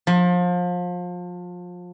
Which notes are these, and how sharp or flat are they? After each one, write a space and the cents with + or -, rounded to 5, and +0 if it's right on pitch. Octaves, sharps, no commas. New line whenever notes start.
F3 +30